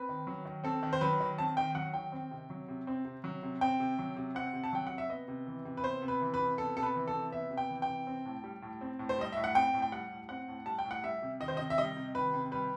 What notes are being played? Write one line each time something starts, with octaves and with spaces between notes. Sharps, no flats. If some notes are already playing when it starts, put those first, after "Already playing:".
Already playing: C4 B4
D#3
F#3
D#3
C4 A4
D#3
C5
F#3 B4
D#3
C4 A5
D#3 G5
F#3 F#5
D#3 G5
C4
C3
F#3
C3
C4
C3
F#3
C3
C4 G5
C3
F#3
C3
C4 F#5
C3
A5
F#3 G5
C3 F#5
E5
B3 D#5
C3
E3
C3
B4
B3 C5
C3
B4
E3
B4
C3
B3 A4
C3 A4
B4
E3
A4
C3
B3 E5
C3
G5
E3
G5
C3
C4
A2
G3
A2
C4
A2
C5
G3 D#5
A2 E5
F#5
C4 G5
A2
G5
G3 F#5
A2
C4 F#5
A2
G3 A5
G5
A2
F#5
G3 E5
C3
D#3 D#5
C5
C3 D#5
E5
G3 D#5
C3
D#3 B4
C3
G3 B4